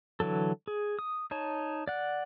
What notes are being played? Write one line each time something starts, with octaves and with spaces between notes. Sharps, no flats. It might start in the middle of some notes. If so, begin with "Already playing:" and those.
D3 E3 F#3 A4
G#4
D#6
D#4 C#5 A5
D5 F#5